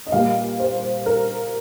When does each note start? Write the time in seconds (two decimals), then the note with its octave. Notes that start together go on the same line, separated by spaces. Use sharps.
0.07 D#5
0.12 A#2 G3 A#3 F5
0.59 C5
1.06 A#4